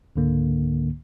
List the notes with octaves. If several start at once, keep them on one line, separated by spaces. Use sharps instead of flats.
C#2 G#2 D3 A#3